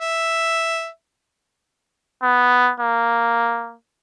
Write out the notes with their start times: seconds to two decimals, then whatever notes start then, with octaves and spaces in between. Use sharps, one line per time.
0.01 E5
2.22 B3
2.80 A#3